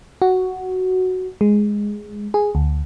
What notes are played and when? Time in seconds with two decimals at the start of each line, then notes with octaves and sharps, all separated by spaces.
0.22 F#4
1.41 G#3
2.34 G#4
2.55 D2